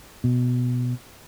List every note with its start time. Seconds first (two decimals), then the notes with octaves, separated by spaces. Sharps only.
0.24 B2